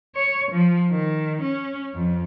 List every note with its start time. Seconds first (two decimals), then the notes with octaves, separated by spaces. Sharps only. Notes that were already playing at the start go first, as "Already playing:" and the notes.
0.15 C#5
0.51 F3
0.91 D#3
1.41 C#4
1.94 F2